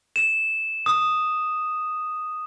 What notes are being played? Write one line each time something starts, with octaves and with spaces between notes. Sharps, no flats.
E7
D#6